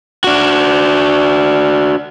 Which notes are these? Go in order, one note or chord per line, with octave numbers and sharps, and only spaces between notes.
D4 F#4